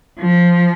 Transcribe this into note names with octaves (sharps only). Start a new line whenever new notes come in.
F3